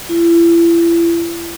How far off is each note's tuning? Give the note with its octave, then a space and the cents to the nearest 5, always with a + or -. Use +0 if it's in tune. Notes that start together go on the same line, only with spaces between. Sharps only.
E4 +40